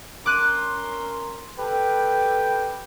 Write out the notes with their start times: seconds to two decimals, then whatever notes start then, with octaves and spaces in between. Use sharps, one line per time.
0.26 C#4 A#4 C6 D6 F#6 D#7
1.60 G4 A4 B4 G5